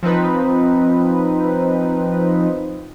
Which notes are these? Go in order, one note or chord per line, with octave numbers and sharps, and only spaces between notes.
F3 C4 D#4 B4